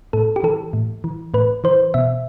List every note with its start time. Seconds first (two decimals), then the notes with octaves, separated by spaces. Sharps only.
0.13 A2 A4
0.36 G4
0.43 E3 A4
0.73 A2
1.04 E3
1.34 A2 B4
1.64 E3 C5
1.94 B2 E5